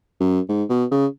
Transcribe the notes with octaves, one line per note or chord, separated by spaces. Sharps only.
F#2
G#2
B2
C#3